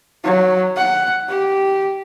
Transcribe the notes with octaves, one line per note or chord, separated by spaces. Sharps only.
F#3
F#5
G4